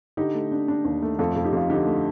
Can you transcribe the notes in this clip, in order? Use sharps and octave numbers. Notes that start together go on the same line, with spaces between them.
D3 D#4 G4
A3
D4
D4
D#2
A3
F2 F4 A4
F2 F4
D#4 G4
F2 F4
D3 D#4 G4
A3